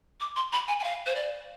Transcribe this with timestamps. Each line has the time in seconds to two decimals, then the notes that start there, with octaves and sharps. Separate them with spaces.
0.20 D6
0.36 C6
0.53 B5
0.68 G#5
0.80 G#5
0.84 F5
1.06 C5
1.15 D5